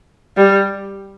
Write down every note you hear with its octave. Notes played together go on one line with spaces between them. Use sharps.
G3